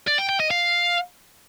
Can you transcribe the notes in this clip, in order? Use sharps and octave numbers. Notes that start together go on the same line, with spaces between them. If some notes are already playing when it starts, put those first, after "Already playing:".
D5
G5
G5
D#5
F5